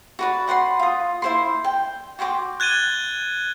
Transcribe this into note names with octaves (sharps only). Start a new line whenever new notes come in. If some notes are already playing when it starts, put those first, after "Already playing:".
F#4 B4 D5
C5 F#5 B5 C6
F4 D#6
E4 C5 C6
G5
F#4 G5 C6 D6
F#6 G#6 A6 D#7 G7